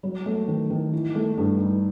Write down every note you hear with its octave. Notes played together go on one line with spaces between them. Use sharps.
F#3
A3
D#3
D#3
E3
A3
G2
D#4